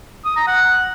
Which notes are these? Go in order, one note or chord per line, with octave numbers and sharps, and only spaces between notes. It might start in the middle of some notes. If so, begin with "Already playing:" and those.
D#6
A#5
F#5